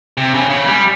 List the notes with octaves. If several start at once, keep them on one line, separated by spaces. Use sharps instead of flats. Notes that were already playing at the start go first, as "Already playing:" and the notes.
C3
C#3
C#3
G3